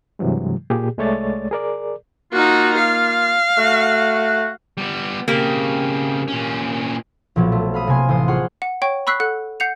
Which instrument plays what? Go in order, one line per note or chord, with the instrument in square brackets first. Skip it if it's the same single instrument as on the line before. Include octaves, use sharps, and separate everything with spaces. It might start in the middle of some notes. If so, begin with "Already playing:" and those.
[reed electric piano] G2 C3 E3 F#3 G#3
A#2 G4 G#4
C2 G#3 A3 C#5 D5 A6
G#4 A#4 D5
[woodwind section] A#3 F4 [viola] D#4 F#4
[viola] F5
[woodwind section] A3 F#4
[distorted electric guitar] G3 B3
[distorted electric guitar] C#3 C4 [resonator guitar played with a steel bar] A#3 G4
[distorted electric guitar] A#2 C#4
[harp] B1 A#2 F3 F#3
A3
F5 B5 D#6
C3 A#3 G#5 C6
A1 C5 D#6 C7
F4 G#4 C#5 F#5 C6
[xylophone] F#5
C#5 G5 C#6
B5 C#6 E6 F#6 B6 C7
A4 F#5 F#6
F#5 G6 C7 C#7 F7